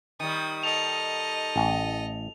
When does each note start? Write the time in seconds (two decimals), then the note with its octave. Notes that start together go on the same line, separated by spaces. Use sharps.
0.20 D#3 G3 D#6
0.63 A4 D#5 F7
1.56 A1